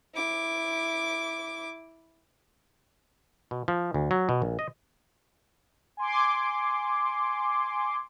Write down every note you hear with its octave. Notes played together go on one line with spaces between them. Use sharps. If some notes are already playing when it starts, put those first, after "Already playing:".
E4 D6
B2
F3
D2
F#3
B2
A#1
D#5
G#5 C6 D6